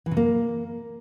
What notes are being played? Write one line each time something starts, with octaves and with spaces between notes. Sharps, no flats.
E3
C3
A#3